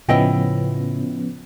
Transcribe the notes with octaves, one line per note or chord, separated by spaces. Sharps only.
A2 C#3 F3 B3 C#4 E4 D#5 G5